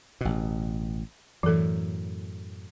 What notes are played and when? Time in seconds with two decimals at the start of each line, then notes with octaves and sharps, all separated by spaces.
0.21 A1 B2
1.43 F#2 A2 E3 A4